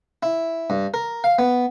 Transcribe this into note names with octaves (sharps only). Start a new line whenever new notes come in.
E4
G2
A#4
F5
B3